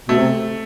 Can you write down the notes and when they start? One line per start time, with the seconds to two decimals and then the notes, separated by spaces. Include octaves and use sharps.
0.08 B2 A3
0.17 C3